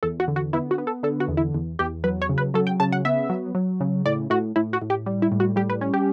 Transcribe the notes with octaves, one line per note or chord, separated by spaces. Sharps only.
E2 A4
F#4
D3
F#4
B3 E4
F#4
B3
A4
D3 A4
F#4
E2
E4
E2
E2 G4
F#3 B4
C#5
C#3
B4
F#3 A4
G5
C#3 A5
F#5
B3 E5
F#3
F#3
C#3
A2 D5
A2 F#4
A2 E4
F#4
A2
G4
G3
E4
A2
F#4
G3 G4
B4
C#4
G4